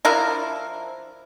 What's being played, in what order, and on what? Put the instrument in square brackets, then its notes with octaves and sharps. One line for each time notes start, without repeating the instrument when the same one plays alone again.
[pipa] F3 D4 E4 A#4